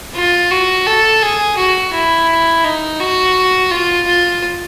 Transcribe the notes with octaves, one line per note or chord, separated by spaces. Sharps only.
F4
F#4
A4
G#4
F#4
E4
D#4
F#4
F4
F4